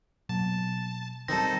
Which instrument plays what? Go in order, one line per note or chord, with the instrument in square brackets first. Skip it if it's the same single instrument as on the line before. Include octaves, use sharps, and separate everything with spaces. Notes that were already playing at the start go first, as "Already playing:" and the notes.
[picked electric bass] B2 F#3 A#3 [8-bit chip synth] A5
[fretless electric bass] D#3 G3 [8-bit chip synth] C4 D#4 A4 [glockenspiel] A5 A#6